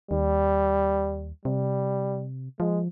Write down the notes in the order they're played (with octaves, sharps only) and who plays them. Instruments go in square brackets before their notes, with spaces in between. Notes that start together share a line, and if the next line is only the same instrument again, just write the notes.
[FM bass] D#2 [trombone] G3
[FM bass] C3 [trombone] G3
[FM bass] F3 [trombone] G#3